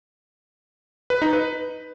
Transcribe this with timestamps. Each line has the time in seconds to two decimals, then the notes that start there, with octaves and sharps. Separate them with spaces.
1.10 B4
1.22 D#4
1.33 B4